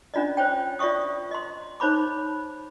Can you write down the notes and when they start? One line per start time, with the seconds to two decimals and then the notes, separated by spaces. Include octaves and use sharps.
0.14 C#4 D4 F4 D5 D#5
0.37 C5 C#5 G5
0.79 F4 D5 E5 C#6 D#6
1.31 D#5 C6
1.80 D#4 C5 C#5 B5 D6